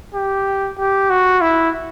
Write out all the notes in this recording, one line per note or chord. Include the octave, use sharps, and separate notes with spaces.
G4
G4
F#4
E4